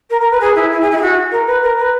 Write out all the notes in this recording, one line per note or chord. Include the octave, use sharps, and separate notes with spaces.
A#4
A#4
B4
G#4
E4
E4
G#4
E4
G#4
F#4
A#4
B4
A#4
B4